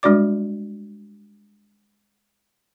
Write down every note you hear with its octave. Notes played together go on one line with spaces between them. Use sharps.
G3 G#3 D4 F#4 D5 D6